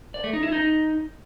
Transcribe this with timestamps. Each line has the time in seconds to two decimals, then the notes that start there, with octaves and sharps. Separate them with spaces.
0.14 D5
0.24 A3
0.33 D#4
0.43 E4
0.52 D#4